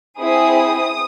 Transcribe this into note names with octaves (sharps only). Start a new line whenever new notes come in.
C4 E4 G#4 D#6